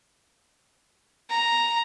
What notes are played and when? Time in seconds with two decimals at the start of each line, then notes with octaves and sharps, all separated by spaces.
1.30 A#5